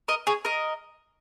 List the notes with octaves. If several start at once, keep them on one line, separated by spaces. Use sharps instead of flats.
A#4 D#5
G#4 C#5
A#4 D#5